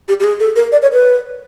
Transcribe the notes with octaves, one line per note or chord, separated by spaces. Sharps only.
G4
G4
G#4
A4
A#4
D5
C#5
B4